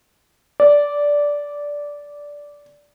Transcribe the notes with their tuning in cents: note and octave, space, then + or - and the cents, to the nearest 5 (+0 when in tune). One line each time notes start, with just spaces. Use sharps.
D5 -10